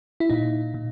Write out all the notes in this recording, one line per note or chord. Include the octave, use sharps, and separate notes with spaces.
E4
A#2 D#4
A#2